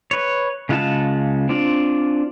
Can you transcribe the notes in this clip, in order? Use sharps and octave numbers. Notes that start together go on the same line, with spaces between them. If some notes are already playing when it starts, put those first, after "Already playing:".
B4 C#5
C#3 G#3 F4 F#5 A5
C4 D4 F4 D5